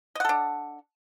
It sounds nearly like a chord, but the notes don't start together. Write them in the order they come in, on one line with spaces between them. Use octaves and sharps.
D#5 F#5 A4 D4